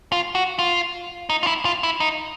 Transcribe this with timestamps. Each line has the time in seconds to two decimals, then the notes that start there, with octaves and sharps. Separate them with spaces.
0.12 F4
0.35 F#4
0.59 F4
1.30 D#4
1.43 F4
1.47 E4
1.65 F4
1.83 E4
2.00 D#4